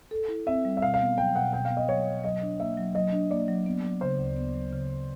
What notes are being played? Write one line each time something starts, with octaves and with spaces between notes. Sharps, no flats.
A4
E4
C4 E5
G3
E5
B2 F5
F5
B3
F#3 G5
B2 F#5
B2 G5
F5
B3
D#5
F#3 C#5
B2
F#3 D#5
D4
A#3 E5
F#3
F#3 D#5
D4
A#3 D5
F#3
B3
F#3
C#3 C5
D2
B3
F#3
C#3